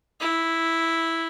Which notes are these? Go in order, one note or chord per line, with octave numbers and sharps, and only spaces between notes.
E4